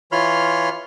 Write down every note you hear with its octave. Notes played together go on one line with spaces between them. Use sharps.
E3 F4 C#5 B5 C6 F6